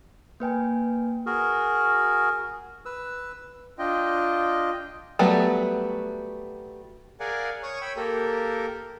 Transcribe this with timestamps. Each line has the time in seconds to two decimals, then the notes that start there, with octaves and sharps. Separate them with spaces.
0.40 A#3 B4 G5 G#5
1.26 F#4 G#4 A#4
2.86 B4 E6
3.78 D4 F4 D#5 G5
5.19 F#3 G3 A3 B3
7.20 G#4 A#4 D5 F5 F#5 G#5
7.63 C#5 C#6 D#6
7.81 C#5 G5 B5 E6
7.97 A#3 G4 A4 A#4